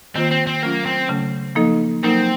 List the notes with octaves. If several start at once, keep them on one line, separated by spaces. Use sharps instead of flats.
D#3 A#3 C4 F4 C5
C4
C4
F#3 A3 A#3 C#4 F4
C4
C#3 F#3 A3 C#4 A4
F3 A#3 D#4 A4 D#5
F#3 A#3 C4 D#4 A#4